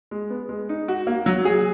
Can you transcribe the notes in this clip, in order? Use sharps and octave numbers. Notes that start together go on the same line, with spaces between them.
G#3
B3
G#3
D#4
F#4
A#3
F#3
G#4